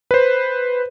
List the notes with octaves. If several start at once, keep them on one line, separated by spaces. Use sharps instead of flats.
B4 C5